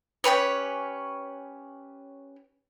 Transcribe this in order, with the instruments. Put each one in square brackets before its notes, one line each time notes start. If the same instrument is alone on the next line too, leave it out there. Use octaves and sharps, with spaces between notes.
[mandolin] C#4 G4 B4 C#5